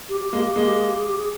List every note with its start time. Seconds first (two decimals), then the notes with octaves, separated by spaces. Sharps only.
0.09 G4
0.21 G4
0.33 G#3 A#3 G4
0.45 G4
0.54 G#3 A#3 G#4
0.65 G4
0.76 G#4
0.86 G4
0.98 G#4
1.07 G4
1.18 G#4